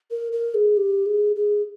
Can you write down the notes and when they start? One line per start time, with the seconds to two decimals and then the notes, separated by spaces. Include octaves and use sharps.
0.11 A#4
0.32 A#4
0.54 G#4
0.77 G4
1.06 G#4
1.36 G#4